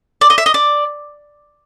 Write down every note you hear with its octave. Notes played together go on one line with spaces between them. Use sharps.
D5
D#5
E5
D#5
D5